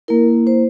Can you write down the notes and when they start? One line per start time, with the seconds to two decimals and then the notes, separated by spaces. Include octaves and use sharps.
0.08 A#3 E4 A#4
0.47 C5